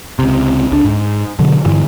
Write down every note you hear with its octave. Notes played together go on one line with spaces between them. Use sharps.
C#2 C3
C#2 D4
G#2
B2 D3 F#3
G2 D3 E3